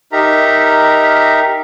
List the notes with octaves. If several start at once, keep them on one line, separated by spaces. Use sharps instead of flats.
D#4 G4 A#4 E5 A#5